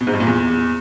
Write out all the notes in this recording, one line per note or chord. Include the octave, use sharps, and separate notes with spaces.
B2
G#2
G2
A#2
E2